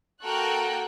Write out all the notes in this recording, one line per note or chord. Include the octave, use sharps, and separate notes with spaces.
A#3 F#4 A4 A#4 G5 F#6